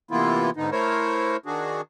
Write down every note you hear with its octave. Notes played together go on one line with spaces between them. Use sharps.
C3 E3 A#3 B3 E4 F4
G#2 D3 B3 D#4
A3 E4 A#4 C5 C#5
D#3 D4 F#4 G#4